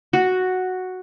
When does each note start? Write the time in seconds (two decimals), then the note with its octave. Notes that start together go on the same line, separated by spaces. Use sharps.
0.13 F#4